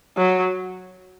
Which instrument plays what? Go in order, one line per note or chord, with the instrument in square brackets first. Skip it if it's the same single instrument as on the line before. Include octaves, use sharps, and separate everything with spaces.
[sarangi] F#3